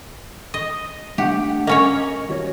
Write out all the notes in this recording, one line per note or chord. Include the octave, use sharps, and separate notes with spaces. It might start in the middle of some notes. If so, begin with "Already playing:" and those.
D#5
A3 D4 G4 F#5
A#3 C#4 C#5 D#5
D#2 F#4 C#5